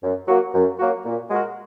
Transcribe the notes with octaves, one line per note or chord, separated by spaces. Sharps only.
F#2
F#3 A#3 F#4
F#2
F#3 A#3 F#4
A#2
G#3 F#4 A#4